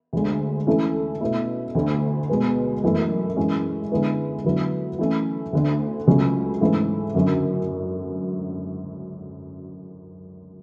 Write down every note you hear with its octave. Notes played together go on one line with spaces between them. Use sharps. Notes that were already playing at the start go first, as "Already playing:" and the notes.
D2 D3 G#3
E3 A3 C#4 E4 A4
B2 A3 E4
D2 D3 A3
B2 G#3 B3
F#2 E3 A3
E3 G#3 C#4
D3 G#3 B3 E4
D3 F#3 B3 E4
E3 A3 C#4
D2 D3 A3
C#2 C#3 F#3 A3 C#4
G#2 E3 A3 C#4
F#2 D3 F#3 C#4 F#4